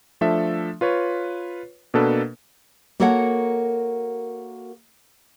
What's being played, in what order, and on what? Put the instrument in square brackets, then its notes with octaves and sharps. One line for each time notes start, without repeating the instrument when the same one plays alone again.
[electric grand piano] F3 A3 D4 A4 E5
F4 B4 C#5
B2 A#3 D4 A4 B4
[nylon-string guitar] A#3 F#4 A4 A#4 C#5 F#5